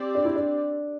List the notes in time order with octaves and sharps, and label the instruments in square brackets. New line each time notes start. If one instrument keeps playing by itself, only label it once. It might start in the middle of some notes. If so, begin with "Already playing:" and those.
Already playing: [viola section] C4 G4 D5
[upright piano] D4
E4
D4